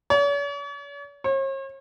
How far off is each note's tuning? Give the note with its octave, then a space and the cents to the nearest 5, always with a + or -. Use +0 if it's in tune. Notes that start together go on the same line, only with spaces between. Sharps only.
C#5 +45
C#5 -45